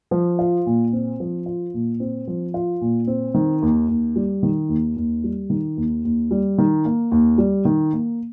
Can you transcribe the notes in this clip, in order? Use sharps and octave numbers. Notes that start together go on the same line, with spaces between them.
F3
F4
A#2
C4
F3
F4
A#2
C4
F3
F4
A#2
C4
D#3
D#2
D#2
G3
D#3
D#2
D#2
G3
D#3
D#2
D#2
G3
D#3
A#3
D#2
G3
D#3
A#3